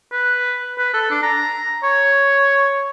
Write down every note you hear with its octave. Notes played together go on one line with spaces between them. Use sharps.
B4
B4
A4
D4
A#5
C#5